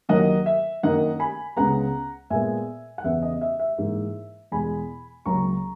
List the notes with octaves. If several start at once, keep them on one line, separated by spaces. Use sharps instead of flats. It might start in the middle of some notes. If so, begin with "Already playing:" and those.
D#2 D#3 F#3 A#3 D#5 F#5
E5
F#2 D#3 A#3 D#5 F#5
G#5 B5
C#2 C#3 G#3 B3 F#5 A#5
A#2 G#3 B3 E5 G#5
F#5
E2 C#3 E3 B3 E5
D#5
E5
E5
G#2 E3 A#3
E2 B2 G#3 G#5 B5
C#2 C#3 F#3 A#3 A#5 C#6